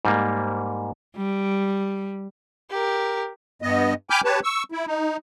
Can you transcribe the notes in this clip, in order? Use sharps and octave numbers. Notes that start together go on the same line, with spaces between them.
G#2 G3 A#3
G3
G4 A#4
G2 B3 D#5
G5 G#5 B5 D6 F6 G6
G4 B4 C#5 A5
C#6 E6
E4
D#4